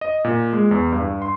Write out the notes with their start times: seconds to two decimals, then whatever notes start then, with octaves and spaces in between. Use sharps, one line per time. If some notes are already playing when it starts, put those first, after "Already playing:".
0.01 D#5
0.24 A#2
0.53 G#3
0.71 E2
0.92 G2
1.22 C6